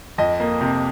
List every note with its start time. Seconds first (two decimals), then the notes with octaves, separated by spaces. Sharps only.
0.18 F2 D#5
0.40 A#3
0.61 C3